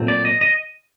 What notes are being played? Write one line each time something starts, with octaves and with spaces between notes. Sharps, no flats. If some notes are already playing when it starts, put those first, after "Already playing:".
Already playing: A#2 F#3 A3 C4
D5
D#5
D#5